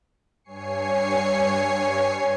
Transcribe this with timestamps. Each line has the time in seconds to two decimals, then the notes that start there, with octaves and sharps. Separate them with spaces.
0.44 G2 C#5 G#5 C7 C#7